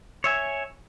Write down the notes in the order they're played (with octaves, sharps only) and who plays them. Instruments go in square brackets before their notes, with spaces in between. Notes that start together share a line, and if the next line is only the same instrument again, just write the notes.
[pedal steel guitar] C#5 E5 G#5